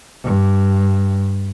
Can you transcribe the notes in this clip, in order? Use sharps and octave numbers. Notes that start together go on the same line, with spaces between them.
G2